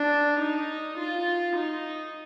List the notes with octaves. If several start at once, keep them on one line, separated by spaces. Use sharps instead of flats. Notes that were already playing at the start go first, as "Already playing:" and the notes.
Already playing: D4
D#4
F4
D#4